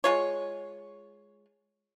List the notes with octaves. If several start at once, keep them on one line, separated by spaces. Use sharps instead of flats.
G#3 F4 C#5